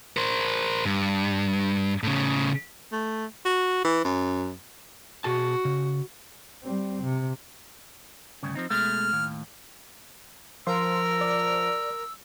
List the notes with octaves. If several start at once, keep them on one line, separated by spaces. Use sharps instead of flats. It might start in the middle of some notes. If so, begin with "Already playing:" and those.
A#4 C5
G2
A2 C#3
A3
F#4
E3
F#2
B2 F#4 G#4 A5
C#3
G3 C4
C3
D2 G2 C#3
F3 C4 D#4
B2 G#3 A3 F6
D#2 A2
F3 A#4 C6 E6
D5